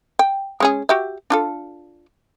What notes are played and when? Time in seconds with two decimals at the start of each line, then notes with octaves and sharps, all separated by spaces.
0.19 G5
0.60 G#3 C#4 G#4
0.89 F#4 G4 E5
1.30 D4 F4 A4